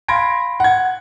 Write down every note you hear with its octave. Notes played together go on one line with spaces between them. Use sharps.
F5 B5 C6 G#6 A#6 D7
F#5 G#6